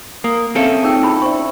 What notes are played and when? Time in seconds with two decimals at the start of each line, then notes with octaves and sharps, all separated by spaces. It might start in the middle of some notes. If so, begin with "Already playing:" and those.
0.24 A#3 D#6
0.55 C4 C#4 A4 E5 F5
0.83 D#4 F4 G#4 C#5 G5 E6
1.03 E4 G#4 B5
1.22 C5 D5 E5 C#6